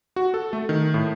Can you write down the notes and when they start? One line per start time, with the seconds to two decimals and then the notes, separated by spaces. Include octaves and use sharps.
0.16 F#4
0.34 A4
0.53 A3
0.69 D#3
0.94 A2